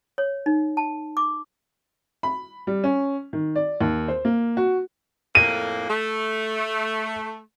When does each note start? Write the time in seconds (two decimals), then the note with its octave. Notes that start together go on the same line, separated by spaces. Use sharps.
0.18 C#5
0.46 D#4
0.77 A5
1.17 D6
2.23 B5
2.67 G3
2.84 C#4
3.33 D#3
3.56 D5
3.81 D#2
4.08 C5
4.25 A#3
4.57 F#4
5.35 F2 A2 A#3 D#7
5.88 A3